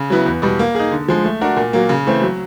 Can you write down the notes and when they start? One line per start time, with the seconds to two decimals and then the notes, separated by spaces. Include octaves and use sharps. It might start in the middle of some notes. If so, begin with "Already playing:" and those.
Already playing: C#3
0.10 F#3 B3 E4
0.26 E2
0.42 B2 G3
0.59 A#3
0.75 D#4 G#4
0.91 D3
1.08 F3 G#3
1.24 A3
1.41 D4 F#4 A#4
1.56 A#2
1.73 F#3 A#3
1.89 C#3
2.07 E3 A3 C4
2.22 F#3